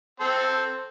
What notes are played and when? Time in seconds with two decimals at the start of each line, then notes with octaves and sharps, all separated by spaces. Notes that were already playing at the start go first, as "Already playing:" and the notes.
0.20 C4 A4 C5